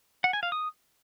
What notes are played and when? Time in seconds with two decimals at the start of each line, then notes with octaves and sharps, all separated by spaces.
0.24 F#5
0.33 G#5
0.43 F5
0.52 D#6